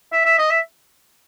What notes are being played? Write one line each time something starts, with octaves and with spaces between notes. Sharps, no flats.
E5
E5
D#5
E5